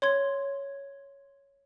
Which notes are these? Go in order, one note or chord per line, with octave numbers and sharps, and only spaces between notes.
C#5 C6 G#6